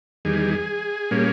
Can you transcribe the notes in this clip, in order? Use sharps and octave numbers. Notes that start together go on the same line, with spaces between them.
E2 D#3 G3 G#4
A#2 G3 A#3 C#4